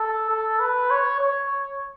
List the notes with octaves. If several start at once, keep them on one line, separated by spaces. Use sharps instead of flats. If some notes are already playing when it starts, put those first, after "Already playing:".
Already playing: A4
A4
B4
C#5
C#5